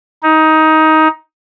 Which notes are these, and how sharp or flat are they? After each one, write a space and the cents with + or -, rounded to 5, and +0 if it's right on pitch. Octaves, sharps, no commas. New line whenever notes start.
D#4 +15